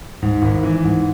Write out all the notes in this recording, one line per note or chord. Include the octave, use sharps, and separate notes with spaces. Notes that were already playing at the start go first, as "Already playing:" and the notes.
G#2
G#1
E3
G#2